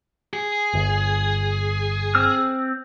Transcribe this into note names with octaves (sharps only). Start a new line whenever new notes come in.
G#4
G1
C4 E6 F6